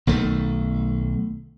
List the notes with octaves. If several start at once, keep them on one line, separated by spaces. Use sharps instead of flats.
B1 D#3 A3